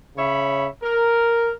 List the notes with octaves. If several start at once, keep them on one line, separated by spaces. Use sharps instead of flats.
C#3 C#5 E5 B5
A#4